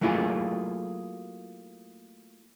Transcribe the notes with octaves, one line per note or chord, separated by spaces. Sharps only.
F#3 A3 A#3 E4 F4 G#4